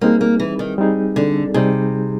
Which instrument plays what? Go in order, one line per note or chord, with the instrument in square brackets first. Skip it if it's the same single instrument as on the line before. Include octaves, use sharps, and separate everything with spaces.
[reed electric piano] G3 C4 D#4 G#4 [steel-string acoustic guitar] A#3
[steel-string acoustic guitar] A#3
E3
D#3
[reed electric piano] G3 C4 D#4 G#4
[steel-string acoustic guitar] D3
[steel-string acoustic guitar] C3 [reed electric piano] G3 C4 D#4 G#4